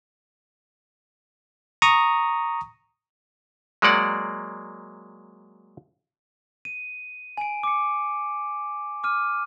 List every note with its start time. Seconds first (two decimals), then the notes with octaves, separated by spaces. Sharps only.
1.82 A#5 C#6 D#6
3.82 F#3 G#3 A#3 D5 F#5
6.65 D#7
7.37 G#5 D7
7.63 D6 C#7
9.04 D6 F6 D#7